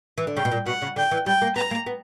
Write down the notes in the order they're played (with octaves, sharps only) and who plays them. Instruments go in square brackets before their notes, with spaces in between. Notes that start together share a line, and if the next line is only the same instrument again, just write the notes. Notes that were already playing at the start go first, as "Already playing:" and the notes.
[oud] E3
D3
[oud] C#3 [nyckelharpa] G5
[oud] B2
A#2
[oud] B2 [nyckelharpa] F#5
[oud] C#3
[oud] D3 [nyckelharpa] G5
[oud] E3
[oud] G3 [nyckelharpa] G5
[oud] A#3
[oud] B3 [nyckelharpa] A#5
[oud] A#3
B3